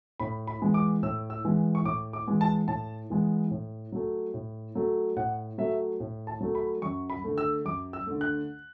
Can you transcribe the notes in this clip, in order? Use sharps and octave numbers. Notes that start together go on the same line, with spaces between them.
A2 B5
B5
E3 G#3 B3
D6
A2 E6
E6
E3 G#3 B3
C#6
A2 D6
D6
E3 G#3 B3
A5
A2 A5
E3 G#3 B3
A2
F#3 A3
A2
F#3 A3
A2 F#5
F#3 A3 E5
A2
A5
F#3 A3
B5
F#2 C#6
B5
D3 A3
E6
F#2 D6
E6
D3 A3
F#6